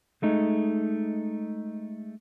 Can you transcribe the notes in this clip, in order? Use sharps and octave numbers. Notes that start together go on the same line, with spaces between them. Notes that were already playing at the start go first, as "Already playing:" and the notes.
G#3 A3 D#4